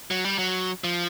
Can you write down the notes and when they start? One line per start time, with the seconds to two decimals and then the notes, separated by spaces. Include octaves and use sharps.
0.11 F#3
0.25 G3
0.38 F#3
0.84 F3